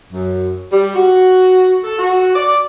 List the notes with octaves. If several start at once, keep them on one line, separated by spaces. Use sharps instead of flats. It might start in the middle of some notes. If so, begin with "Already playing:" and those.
F#2
G3
F#4
A4
F#4
D5